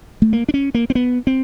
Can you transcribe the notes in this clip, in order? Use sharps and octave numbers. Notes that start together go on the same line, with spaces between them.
A3
A#3
D4
C#4
A#3
C4
B3
C4